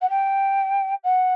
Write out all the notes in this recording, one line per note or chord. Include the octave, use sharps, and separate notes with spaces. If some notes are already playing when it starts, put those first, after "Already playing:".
F#5
G5
F#5